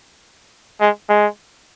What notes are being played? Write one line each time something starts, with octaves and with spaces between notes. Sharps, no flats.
G#3
G#3